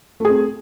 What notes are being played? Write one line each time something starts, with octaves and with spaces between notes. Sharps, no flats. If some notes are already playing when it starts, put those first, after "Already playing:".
A3 C4 G#4